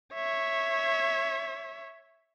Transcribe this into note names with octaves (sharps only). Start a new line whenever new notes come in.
C#5 E5